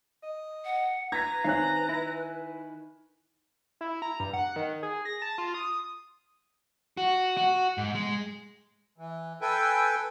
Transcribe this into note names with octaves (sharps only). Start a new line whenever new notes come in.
D#5
F#5
B4 A#5 G#6 B6
D#3 C4 C#5 F5 G#5 F#6
E4
E4
A#5
G2
F#5
D#3
G#4
A#6
A5
F4
D#6
F#4
F#4
G#2
G#3
E3
A4 B4 G5 G#5